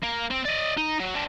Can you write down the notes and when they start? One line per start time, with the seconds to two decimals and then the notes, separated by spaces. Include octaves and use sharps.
0.03 A#3
0.31 C4
0.45 D5 D#5
0.77 D#4
1.00 F#3
1.14 C4 D4